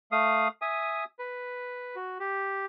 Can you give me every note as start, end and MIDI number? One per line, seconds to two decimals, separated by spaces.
0.12 0.48 57
0.12 0.48 77
0.12 0.48 87
0.62 1.04 76
0.62 1.04 80
0.62 1.04 87
1.19 1.95 71
1.95 2.18 66
2.20 2.66 67